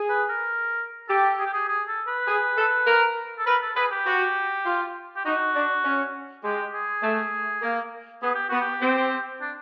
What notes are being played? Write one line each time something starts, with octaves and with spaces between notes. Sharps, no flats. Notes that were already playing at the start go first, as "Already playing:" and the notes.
Already playing: G#4
B4
A#4
G4 A4
G#4
G4
G#4
G#4
A4
B4
G#4
A4
A#4
A4
A#4 B4
A4
G#4 B4
G4
F#4
F4
G4
D#4 F#4
D4
C#4
G#3 G4
G#4
A3
A#3
B3 G#4
G4
B3 F#4
G4
C4
D4